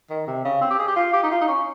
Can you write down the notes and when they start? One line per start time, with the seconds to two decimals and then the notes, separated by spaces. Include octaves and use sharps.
0.10 D#3
0.27 C3
0.45 C#3
0.62 C4
0.71 G4
0.79 G#4
0.88 G4
0.96 F4
1.13 G4
1.23 D#4
1.31 F4
1.41 D#4
1.48 C#4